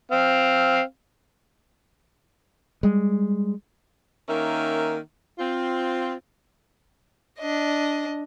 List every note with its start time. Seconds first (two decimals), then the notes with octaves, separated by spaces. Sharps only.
0.12 C4 F5
2.83 G3 G#3
4.28 D#3 A#3 C#4 A#4 E5
5.39 C4 F4
7.39 D4 D#5